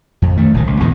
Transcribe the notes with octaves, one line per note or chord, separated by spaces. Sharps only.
F2
D#3 A3
F1 B1 A#2 D#3
C#2
A#1 E2 G#2 D#3